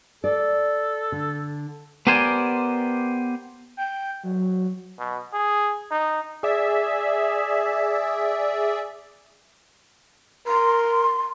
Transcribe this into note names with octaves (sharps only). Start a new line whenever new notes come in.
A4 D5
D3
B3 G4 A#4 C5 D5 G#5
G5
F#3
B2
G#4
D#4
G#4 D5 E5
A#4 C6